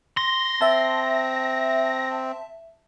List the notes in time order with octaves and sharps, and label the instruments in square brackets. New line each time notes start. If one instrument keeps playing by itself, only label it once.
[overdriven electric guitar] C6 [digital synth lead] A#6
[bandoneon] C4 [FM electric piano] E5 A5